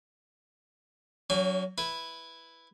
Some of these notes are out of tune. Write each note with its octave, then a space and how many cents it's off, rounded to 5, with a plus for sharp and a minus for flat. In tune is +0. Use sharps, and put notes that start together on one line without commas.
F#3 +0 C#4 +40 G#5 -45
E4 +0 B4 +0